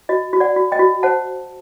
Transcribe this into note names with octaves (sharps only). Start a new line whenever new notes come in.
F#4 D#5
F#4
D5 F#5
F#4
D#5 G5
F#4
C5 F#5 A5